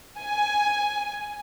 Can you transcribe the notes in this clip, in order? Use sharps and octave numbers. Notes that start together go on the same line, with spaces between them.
G#5